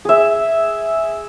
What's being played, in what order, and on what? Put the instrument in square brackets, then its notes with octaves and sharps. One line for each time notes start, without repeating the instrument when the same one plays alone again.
[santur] G#4 E5